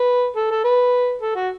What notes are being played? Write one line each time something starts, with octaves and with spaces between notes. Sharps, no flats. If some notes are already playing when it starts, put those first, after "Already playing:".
Already playing: B4
A4
A4
B4
A4
F#4